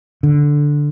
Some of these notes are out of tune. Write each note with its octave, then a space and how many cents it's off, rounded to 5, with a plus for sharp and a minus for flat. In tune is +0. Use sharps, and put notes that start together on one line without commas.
D3 +0